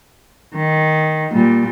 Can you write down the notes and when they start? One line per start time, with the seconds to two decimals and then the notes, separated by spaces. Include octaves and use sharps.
0.55 D#3
1.32 A#2 G3